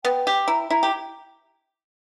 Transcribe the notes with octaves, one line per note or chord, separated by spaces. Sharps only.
B3 G5
G4
E4 A#5
E4 A#5
G4